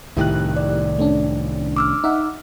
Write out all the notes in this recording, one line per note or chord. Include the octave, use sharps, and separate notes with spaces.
C2 A2 D#3 E4 G4 F#6
D5
A3 C#4 D4
D6 E6 F6
D#4 E5 F#5